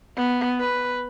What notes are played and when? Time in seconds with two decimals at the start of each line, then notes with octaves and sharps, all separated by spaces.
0.17 B3
0.60 B4